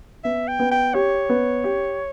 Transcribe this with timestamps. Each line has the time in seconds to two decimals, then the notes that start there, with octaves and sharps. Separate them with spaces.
0.24 B3 E5
0.48 G5
0.59 B3
0.71 G5
0.94 G4 C#5
1.29 B3
1.64 G4